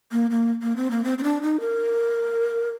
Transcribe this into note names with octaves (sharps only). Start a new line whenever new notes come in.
A#3
A#3
A#3
C4
A#3
C4
C4
D4
D#4
A#4